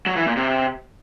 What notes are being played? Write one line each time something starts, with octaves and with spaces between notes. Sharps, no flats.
F#3
E3
A#2
C3